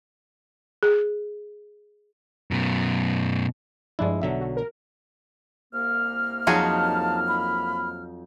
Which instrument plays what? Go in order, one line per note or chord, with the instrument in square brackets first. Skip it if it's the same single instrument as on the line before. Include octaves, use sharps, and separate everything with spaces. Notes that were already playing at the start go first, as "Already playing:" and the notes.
[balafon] G#4
[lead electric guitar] F#2 B2
[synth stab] G2 F3 D4 [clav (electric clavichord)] G#3 E4
[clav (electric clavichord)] B1 D3 F#3 [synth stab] E5
[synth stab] F#4
A#4
[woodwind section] C2 A#3 F6
[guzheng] F2 F#3 D#4 [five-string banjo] F4 F#4 G#4 [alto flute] A5
[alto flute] B5